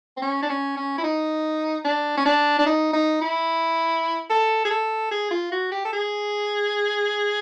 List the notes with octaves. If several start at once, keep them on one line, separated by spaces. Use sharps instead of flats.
C4
C#4
D4
C#4
C#4
E4
D#4
D4
C#4
D4
D4
D#4
D#4
E4
A4
G#4
A4
G#4
F4
F#4
G4
A4
G#4